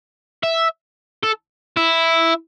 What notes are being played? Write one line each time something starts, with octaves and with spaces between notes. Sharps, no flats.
E5
A4
E4